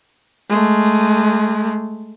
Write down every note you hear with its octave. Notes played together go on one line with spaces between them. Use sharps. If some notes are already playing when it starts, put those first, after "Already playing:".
G#3 A3